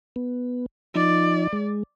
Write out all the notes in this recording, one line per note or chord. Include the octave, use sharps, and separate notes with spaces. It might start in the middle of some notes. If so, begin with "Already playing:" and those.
B3
F3 D#4 D5
G#3